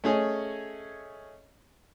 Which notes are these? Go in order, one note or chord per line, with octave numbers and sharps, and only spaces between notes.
A3 C#4 G#4 C#5 D#5